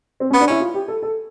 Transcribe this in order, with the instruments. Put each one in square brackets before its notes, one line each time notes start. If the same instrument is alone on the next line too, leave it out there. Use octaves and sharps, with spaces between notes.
[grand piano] C4
C#4
[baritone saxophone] B3
[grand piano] D4
[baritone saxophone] C#4 [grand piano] E4
[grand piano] F4
G4
A4
A4